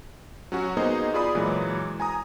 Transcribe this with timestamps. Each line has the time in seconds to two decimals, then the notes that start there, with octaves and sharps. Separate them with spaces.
0.52 F#3 C#4 F#4
0.77 A#3 B3 D#4 G#4 C5 D#5
1.14 F4 G#4 D5 B5 D#6
1.35 A#2 E3 F#3 G#3
2.00 G#5 A#5 D#6